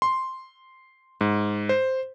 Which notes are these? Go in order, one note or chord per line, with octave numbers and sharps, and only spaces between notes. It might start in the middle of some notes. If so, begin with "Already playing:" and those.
C6
G#2
C5